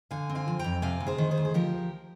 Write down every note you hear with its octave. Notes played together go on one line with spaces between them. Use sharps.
D3 F5 G#5
C4
F5 G#5
F3
F2 G5 A#5
C3 F5 G#5
D2
G#4 C5
D#3
G#4 C5
D2
G#4
F3 G4 A#4